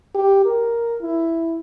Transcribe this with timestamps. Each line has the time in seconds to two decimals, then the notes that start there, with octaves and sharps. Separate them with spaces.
0.15 G4
0.45 A#4
1.02 E4